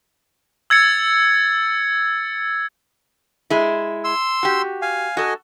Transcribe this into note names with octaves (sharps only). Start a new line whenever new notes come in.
E6 G#6 A6 C#7
G#3 E4
C6 E6
F#4 G4
F5 G#5
F#4 A4 D#5 G#5